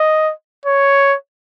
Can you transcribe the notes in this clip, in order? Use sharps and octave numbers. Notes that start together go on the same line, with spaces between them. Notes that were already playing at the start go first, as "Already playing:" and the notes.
Already playing: D#5
C#5